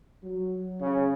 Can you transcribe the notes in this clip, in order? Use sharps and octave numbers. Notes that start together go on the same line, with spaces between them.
F#3
C#3